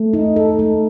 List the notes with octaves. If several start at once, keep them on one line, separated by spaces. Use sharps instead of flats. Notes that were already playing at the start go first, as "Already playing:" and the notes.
Already playing: A3
D#4
A4
A3